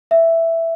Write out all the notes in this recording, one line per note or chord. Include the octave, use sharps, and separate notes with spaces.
E5